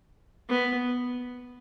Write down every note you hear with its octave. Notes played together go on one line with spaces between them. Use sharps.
B3